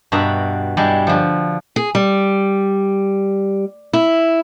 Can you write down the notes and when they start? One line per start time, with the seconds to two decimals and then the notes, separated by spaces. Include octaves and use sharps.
0.12 G2 B2 F#4 E5 A#5 B5
0.77 G2 G3 G#3 E4
1.07 D3 F3
1.76 G#4
1.95 G3
3.93 E4